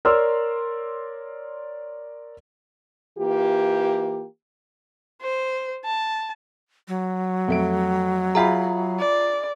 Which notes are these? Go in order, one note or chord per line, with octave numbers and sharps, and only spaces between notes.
A#4 C#5 D5 C6 E6 F6
E3 A#3 F4 G4
C5
A5
F#3
F2 A3 D7
F4 G#4 E5 F5 A#5 B5
D5